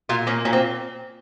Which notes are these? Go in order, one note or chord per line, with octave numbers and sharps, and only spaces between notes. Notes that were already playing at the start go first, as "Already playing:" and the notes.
A#2 F4
A#3 C#4
A#2 C#4
C4